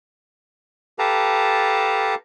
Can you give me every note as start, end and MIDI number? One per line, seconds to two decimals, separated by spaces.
0.99 2.15 67
0.99 2.15 69
0.99 2.15 71
0.99 2.15 77
0.99 2.15 81
0.99 2.15 82